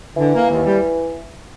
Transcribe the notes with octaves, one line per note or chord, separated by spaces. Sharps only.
D3 E3
A#3
D#2
G3